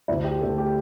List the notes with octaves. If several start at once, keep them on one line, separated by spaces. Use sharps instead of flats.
D2 E4
G4
D3 A3 A4
G4